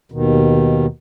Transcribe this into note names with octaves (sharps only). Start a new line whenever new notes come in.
D#2 B2 D#3